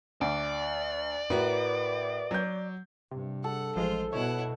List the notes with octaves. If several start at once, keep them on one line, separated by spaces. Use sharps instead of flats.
D2 D5
A2 F#4 A#4 B4
F#3 G6
G2 C3
A4 F#5
A1 F3 G#3 F4 C5
B2 E4 C#5 F#5